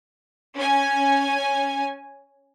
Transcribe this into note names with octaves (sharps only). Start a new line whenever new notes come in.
C#4 G#5